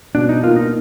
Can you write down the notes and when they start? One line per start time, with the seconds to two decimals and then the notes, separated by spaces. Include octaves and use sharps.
0.15 B2 D4
0.29 D#4
0.43 A#3 F4
0.56 D#4